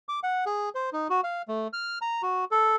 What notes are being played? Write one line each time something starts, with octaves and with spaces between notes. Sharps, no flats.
D6
F#5
G#4
C5
D#4
F#4
F5
A3
F6
A#5
F#4
A4